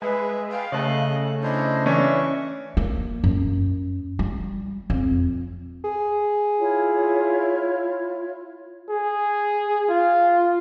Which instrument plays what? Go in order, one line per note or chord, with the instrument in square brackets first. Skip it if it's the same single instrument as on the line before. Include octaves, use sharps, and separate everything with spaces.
[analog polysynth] G#3 [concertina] G#4 E5 [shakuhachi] B4
[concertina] G#4 B4 G5 [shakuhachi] F5
[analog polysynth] C#3 A3 [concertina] D#5 F#6
[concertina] D4 E4 C5 [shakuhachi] D#5
[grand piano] E3 C#4 D4 [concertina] E5 C#6
[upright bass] A#3
F#2
G3
F2
[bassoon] G#4
[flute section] E4 F4 C#5
[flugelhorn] G#4
F4